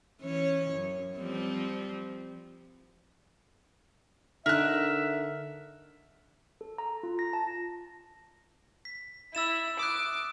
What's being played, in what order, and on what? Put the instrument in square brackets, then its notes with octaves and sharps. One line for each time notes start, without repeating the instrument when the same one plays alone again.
[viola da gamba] E3 C#4 C#5
F#2
F3 G3 C4
[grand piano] D3 D#4 [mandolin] A#4 F#6 [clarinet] E5
[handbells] A4
A#5
F4
A#6
A5
[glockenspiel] B6
[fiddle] E4 [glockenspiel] E6 A6 E7
[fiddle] D6 [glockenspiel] D#6 F#6